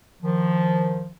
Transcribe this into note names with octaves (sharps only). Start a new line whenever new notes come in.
D#3 F3